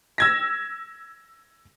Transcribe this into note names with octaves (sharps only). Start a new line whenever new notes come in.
E6 G#6 A#6